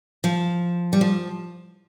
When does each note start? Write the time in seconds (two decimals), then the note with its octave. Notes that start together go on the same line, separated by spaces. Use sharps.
0.24 F3
0.93 G3
1.01 F3